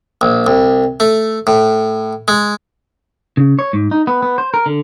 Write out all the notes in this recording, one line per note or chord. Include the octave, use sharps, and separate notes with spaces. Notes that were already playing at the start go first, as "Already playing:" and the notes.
A#1
C2
A3
A2
G#3
C#3
C#5
G#2
D#4
B3
B3
C5
A#4
D3